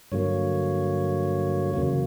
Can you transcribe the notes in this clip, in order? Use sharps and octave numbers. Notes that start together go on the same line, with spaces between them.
G2 D3 F#3 A#3 C#5
E2 C#3 F#3 A#3